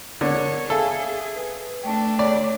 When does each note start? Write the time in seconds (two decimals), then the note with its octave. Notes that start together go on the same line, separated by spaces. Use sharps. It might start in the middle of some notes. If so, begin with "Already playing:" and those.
0.21 D3 A#4 C#5
0.70 G#4 A4 E5 F5 G#5
1.36 B4
1.83 A3 D4 G5 A5
2.19 C#5 D5